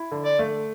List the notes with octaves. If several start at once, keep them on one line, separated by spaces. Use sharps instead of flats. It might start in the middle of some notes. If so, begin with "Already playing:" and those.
Already playing: E4
D3
D5
A3